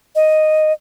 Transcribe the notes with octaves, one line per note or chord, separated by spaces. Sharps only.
D#5